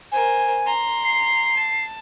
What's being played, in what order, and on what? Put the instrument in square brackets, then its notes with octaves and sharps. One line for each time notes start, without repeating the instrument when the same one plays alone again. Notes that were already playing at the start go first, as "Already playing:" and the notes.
[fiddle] A#4 C5 [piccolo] G#5
[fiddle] A#5 C6
[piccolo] C7
[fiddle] A5